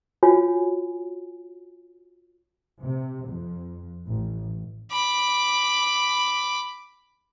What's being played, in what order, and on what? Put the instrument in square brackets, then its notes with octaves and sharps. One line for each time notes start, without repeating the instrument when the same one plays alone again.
[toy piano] F4 F#4 C#5 G#5
[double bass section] C3
F2
A1
[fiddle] B5 D6